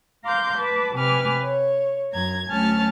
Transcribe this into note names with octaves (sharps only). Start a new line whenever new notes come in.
F5 A#5 C6 D6 G6
B4 A5 D6
C3 B4 G#5 D6 F6
C#5
F#2 A#5 G#6
D2 F#3 C#4 G#5 A5 F6